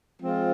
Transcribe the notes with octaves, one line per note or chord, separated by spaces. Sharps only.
F3 G#3 C4 F4